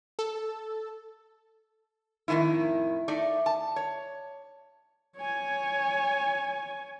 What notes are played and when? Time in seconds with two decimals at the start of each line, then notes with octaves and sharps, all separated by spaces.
0.19 A4
2.28 F2 A2 D#3 D#4 E4
3.08 A3 D#4 D5
3.46 A5
3.76 C#5
5.17 C#5 G#5